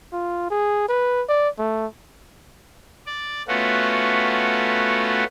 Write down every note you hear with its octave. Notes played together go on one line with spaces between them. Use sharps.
F4
G#4
B4
D5
A3
D5
A3 B3 C#4 F4 F#4